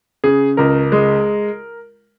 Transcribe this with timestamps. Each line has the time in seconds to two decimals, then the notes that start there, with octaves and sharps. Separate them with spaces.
0.24 C#3 G#4
0.57 C#2 A#4
0.92 G#3